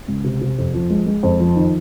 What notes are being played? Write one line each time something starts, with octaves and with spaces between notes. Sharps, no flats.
C#2
C3
C3
F2
F3
G#3
G#3
F2
F3
D#3